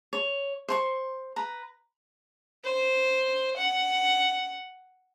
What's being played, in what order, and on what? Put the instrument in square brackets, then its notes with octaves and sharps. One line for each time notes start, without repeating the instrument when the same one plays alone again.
[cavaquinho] C#5
C5 C6 C#6
B4 A#5
[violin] C5
F#5